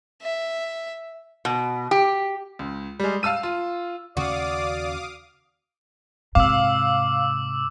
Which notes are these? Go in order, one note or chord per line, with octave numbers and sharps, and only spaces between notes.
E5
B2
G4
C#2
G3 G#3
F5 A5 E6 D#7
F4
D#2 C#3 C#4 F#4 D5 F5 D6 D#6
G#2 C3 F5 D6 E6